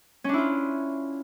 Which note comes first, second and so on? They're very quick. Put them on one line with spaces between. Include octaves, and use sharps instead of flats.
C#4 D4 E4 F4